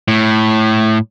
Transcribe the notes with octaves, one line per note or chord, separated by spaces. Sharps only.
A2